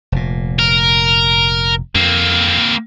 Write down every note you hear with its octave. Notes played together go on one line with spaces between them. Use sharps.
F1 A#2
A#4
F2 A#3 C4